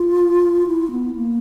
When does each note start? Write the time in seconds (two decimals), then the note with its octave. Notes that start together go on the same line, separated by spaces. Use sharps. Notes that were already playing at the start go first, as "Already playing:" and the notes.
Already playing: F4
0.67 E4
0.91 B3
1.15 A#3